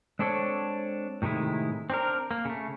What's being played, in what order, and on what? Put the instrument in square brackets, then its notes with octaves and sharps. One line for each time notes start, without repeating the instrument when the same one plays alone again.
[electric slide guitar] G#3 C4 D4 A4 C#5
A2 C3 D#3 G#3 E4
C4 D4 A#4
A#3
C#3 A3